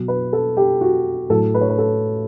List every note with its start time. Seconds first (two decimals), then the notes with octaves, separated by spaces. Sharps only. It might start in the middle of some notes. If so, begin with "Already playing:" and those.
Already playing: B2 F#3
0.08 B4
0.33 A4
0.57 G4
0.81 F#4
1.30 A2 F#3 A4
1.54 B4
1.61 C#5
1.69 B4
1.78 A4